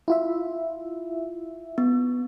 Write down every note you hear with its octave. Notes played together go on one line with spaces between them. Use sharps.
E4 F4 E5
B3